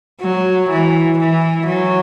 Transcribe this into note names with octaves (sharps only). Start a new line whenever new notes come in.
F#3
E3
E3
F#3